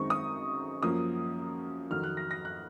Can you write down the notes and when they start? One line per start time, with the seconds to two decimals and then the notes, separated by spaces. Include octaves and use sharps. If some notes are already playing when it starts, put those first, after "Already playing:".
Already playing: F#2 D#3 G#3 C4 D#4 C#6
0.10 D#6
0.82 F#2 F3 A#3 C#4 D#6
1.91 F2 D#3 F#3 F6
2.04 F#6
2.17 A#6
2.31 A#6
2.45 F#6